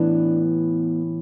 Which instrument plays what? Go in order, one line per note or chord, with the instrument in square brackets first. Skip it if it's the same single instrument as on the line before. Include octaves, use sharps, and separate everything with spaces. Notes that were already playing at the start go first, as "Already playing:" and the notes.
Already playing: [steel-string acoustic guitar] A2 E3 B3 D4